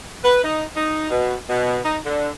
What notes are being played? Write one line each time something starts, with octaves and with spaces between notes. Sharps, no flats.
B4
D#4
D#4
B2
B2
D#4
D3